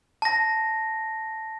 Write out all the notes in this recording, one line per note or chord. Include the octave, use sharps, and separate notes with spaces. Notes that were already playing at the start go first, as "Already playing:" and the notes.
A5 A#6